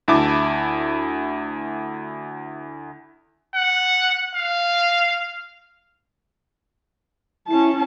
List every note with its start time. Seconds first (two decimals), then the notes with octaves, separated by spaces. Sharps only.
0.08 D2 E4 A5 D6
3.54 F#5
4.34 F5
7.48 C#4 E4 A5